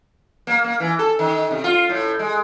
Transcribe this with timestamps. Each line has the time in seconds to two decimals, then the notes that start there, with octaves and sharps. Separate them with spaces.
0.47 A#3
0.64 A#3
0.80 E3
0.99 A4
1.19 D#3
1.51 C3
1.64 F4
1.89 A2
2.19 G#3